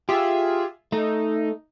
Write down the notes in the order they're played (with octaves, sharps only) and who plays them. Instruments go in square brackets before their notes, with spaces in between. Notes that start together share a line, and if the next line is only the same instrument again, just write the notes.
[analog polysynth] F4 G#4 E5 [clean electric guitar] G4
[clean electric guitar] A3 [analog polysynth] D#4